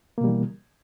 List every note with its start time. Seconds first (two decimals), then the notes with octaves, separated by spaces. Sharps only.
0.18 A#3
0.21 B2
0.24 G3
0.27 E3